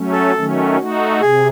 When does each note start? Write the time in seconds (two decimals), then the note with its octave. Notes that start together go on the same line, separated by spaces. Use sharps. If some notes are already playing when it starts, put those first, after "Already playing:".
Already playing: F#3 A3 C#4
0.12 A4
0.35 D#3 F#3 A3 C#4
0.78 A3 D#4 F#4
1.21 C3 G#4